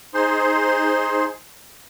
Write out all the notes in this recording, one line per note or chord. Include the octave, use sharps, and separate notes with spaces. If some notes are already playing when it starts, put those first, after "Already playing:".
D#4 G#4 C5 C6